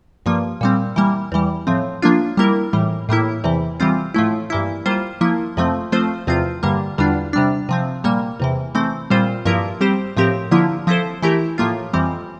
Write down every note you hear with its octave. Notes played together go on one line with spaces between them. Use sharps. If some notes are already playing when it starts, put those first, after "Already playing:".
G2 F3 A#3
A#2 G3 C4
E3 G3 A#3
E2 E3 G3
A2 F3 C4
F3 A#3 D4 F4
G3 A#3 E4 A#4
A2 E3 G3
A2 G3 A#3 E4
E2 C3 E3
E3 G3 C4 F4
A2 F3 A3 E4
G2 E3 A#3 E4
G3 A#3 F4 C5
F3 A#3 E4
F2 C3 F3 A3 C4
F3 A3 C4 F4 C5
E2 C3 F3 C4 F4
G2 D3 G3 A#3
E2 D3 G3 D4 F4
C3 G3 D4
C3 F3 C4
A#2 G3 A#3
E2 C3 E3
E3 A3 C4
A#2 G3 C4 F4 C5
G2 F3 A#3 E4 A#4
G3 C4 G4 C5
A2 F3 C4 G4 A#4
D3 F3 A#3 E4
F3 C4 E4 A4 C5
E3 A3 E4 G4 A#4
A2 F3 A#3 F4
F2 E3 G3 C4